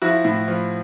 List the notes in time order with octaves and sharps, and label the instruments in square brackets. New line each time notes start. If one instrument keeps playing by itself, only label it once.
[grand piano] F3 E4 F#4
A2
F3